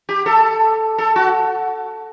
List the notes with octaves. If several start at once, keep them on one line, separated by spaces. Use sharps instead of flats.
G4
A4
A4
F#4